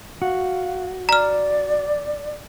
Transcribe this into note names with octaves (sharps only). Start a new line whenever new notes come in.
F#4 F5
D5 A#5 F6